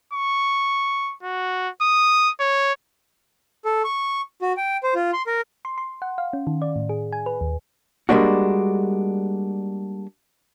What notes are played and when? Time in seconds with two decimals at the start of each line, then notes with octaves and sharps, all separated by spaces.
0.13 C#6
1.23 F#4
1.82 D#6
2.40 C#5
3.65 A4
3.84 C#6
4.42 F#4
4.57 G5
4.83 C5
4.95 F4
5.13 C6
5.27 A#4
5.65 C6
5.78 C6
6.02 F#5
6.18 F5
6.33 C#4
6.47 D#3
6.62 D5
6.76 A2
6.89 G#4
7.13 G#5
7.26 B4
7.41 D#2
8.09 G3 G#3 A#3 D4 F#4